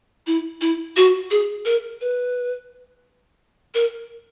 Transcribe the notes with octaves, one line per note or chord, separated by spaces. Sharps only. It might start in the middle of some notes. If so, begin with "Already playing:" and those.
E4
E4
F#4
G#4
A#4
B4
A#4